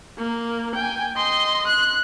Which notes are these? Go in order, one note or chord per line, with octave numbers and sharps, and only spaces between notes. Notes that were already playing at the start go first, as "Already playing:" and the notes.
A#3
G5 G#5
D#5 C6
F#6